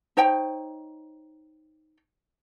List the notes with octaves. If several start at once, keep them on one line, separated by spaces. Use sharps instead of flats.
D#4 C5 C#5 G5